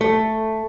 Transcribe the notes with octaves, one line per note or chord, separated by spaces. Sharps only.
A3